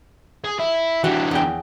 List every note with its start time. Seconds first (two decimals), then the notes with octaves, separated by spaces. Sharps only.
0.44 G#4
0.59 E4
1.04 E3 D4 F#4 G4
1.31 E2 G5